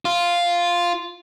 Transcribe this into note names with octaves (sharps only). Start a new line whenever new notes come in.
F4